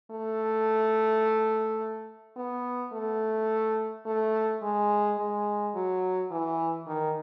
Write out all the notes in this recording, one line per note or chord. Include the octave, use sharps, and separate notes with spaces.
A3
B3
A3
A3
G#3
G#3
F#3
E3
D#3